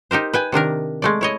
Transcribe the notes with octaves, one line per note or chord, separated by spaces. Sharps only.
D#4 G4 A#4 C5
B4 G5 G#5
C3 D#3 D4 A#4
G#3 A3 D5
E4 C#5 D#5